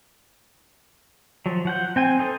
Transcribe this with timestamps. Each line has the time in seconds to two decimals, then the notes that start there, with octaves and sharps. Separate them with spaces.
1.46 F3 F#3
1.65 F3 F#5 G6
1.96 C4 G5 G#5
2.19 D#4 A4 C5